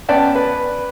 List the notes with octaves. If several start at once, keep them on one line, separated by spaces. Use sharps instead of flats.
B3 C#4 D5 F#5 G5 A5
B4